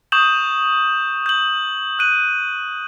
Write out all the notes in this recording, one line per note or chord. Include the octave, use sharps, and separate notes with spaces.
C#6 D#6 G6 E7 F#7
G6 F#7
F#6 D#7 F#7